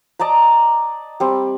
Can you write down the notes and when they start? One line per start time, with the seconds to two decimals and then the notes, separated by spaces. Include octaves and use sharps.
0.19 D5 D#5 A5 A#5
1.20 G3 C4